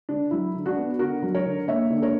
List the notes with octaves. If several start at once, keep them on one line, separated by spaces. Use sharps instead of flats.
D3 D4
F#3 E4
D3
D4 F#4
B3
D3 F#4 A#4
F#3
A#4 C#5
D3
A#3 C#5 E5
D3
A#4 C#5